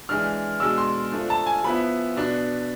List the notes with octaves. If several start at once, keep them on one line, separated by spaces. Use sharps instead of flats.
E3 G#3 D4 F6
B2 G#3 D4 E6
C6
F3 A3 D4
A5
G#5
F3 B3 E4 B5
B2 B3 D4